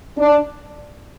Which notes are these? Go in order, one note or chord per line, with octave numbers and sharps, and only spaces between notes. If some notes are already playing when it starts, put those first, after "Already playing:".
D4